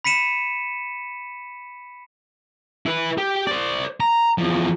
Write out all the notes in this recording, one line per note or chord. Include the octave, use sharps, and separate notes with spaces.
B5 B6 C#7 D#7 E7
E4 B4
G4
C5 D5
A#5
E2 F3